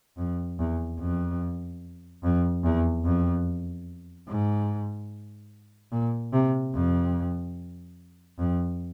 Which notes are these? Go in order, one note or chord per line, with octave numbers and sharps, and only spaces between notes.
F2
E2
F2
F2
E2
F2
G#2
A#2
C3
F2
F2